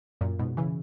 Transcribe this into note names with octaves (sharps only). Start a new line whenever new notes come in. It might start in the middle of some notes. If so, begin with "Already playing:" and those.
F#2 A#2
G#2 B2
C#3 E3